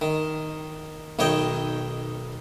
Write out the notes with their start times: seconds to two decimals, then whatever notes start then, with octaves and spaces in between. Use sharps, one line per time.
0.01 D#3
1.19 B1 D#3 C#5 D#5 G5